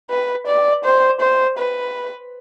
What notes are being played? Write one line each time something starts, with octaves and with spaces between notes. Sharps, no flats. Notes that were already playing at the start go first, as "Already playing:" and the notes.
B4
D5
C5
C5
B4